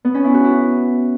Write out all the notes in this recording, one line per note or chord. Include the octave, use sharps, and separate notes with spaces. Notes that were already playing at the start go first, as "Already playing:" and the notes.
B3
C#4
E4
F#4
E4